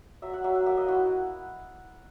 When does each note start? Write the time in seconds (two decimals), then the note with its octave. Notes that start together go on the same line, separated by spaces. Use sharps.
0.22 F#3 E5
0.33 F#5
0.44 F#3 E5
0.55 F#5
0.66 A#3 E5
0.77 D#5
0.88 E4 F#4